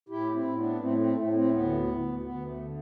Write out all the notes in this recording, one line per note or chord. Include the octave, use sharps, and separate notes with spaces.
A2 E4 G4
C4 E4
A2
B3 D4
A2 A3 C4
A3 C4
A2 A3
A3 C4
A3
D2 B3
D2
D2 B3
A3
D3